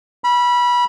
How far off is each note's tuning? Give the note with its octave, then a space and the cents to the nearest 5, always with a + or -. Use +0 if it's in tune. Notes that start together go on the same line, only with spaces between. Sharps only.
B5 -20 E6 +45